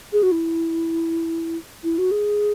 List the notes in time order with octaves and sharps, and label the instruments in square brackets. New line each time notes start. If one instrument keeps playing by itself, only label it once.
[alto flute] G#4
F#4
E4
E4
F#4
G#4